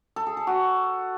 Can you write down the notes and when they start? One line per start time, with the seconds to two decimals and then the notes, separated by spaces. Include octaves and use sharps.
0.16 A4
0.27 G#4
0.37 A4
0.47 F#4